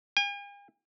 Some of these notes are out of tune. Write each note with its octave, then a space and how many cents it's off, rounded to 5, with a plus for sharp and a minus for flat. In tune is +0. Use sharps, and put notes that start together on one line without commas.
G#5 -45